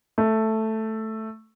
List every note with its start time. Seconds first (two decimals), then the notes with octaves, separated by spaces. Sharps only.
0.18 A3